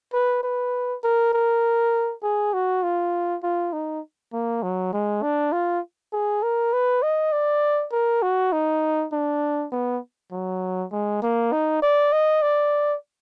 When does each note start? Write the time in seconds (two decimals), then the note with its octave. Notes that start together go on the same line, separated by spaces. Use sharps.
0.13 B4
0.43 B4
1.04 A#4
1.33 A#4
2.23 G#4
2.53 F#4
2.83 F4
3.43 F4
3.73 D#4
4.33 A#3
4.63 F#3
4.93 G#3
5.23 D4
5.53 F4
6.13 G#4
6.43 A#4
6.73 B4
7.03 D#5
7.33 D5
7.92 A#4
8.23 F#4
8.52 D#4
9.13 D4
9.72 B3
10.32 F#3
10.92 G#3
11.23 A#3
11.52 D#4
11.82 D5
12.13 D#5
12.42 D5